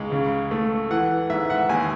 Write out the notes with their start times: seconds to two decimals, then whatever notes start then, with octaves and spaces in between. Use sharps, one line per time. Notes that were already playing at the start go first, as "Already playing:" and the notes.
Already playing: C#2 G#3
0.12 C#3
0.51 A3
0.91 E3 F#5
1.30 G#2 E5
1.50 F#5
1.69 D#2 G#5